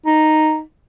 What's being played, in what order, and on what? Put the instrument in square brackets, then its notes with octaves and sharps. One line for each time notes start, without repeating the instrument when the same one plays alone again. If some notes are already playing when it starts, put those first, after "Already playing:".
[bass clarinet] D#4